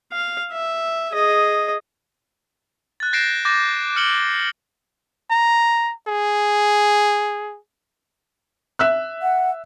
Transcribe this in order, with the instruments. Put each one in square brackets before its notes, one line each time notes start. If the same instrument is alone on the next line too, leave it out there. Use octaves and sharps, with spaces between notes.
[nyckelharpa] F5
E5
G#4 D#5
[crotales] F#6 A6
G6 A#6 C7 D7 E7
D6 G6 A6 A#6
F6 C#7 D7 F#7 G7
[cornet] A#5
G#4
[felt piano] E5 E6 F#6
[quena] F#5